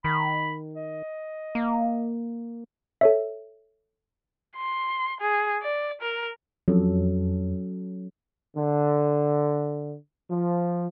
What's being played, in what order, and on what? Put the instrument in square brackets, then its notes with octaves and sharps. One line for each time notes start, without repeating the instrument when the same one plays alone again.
[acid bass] D#3 [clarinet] B5
[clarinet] D#5
[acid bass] A#3
[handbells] A4 C#5 E5
[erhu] C6
G#4
D5
A#4
[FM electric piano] F2 [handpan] F#3 C#4 A4
[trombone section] D3
F3